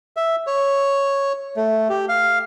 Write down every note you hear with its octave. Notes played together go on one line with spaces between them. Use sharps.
E5
C#5
A3
G4
F5